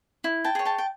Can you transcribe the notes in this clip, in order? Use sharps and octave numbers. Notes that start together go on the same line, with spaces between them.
E4
G5 A5
G#4 C#5
G5 A5
G5